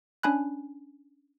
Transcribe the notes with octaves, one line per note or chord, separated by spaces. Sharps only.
C#4 D4 G#5 B5 F#6